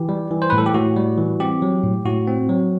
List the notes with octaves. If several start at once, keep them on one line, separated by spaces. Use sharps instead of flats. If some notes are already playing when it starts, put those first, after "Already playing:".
Already playing: E3 G4
G3
E3
C5
A2 B4
A4
G4
A2 F#4
G3
E3
C4 G4
F#3
A2
A2 F#4
C4
F#3